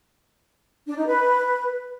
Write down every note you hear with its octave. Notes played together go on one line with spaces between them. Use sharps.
D4
D#4
B4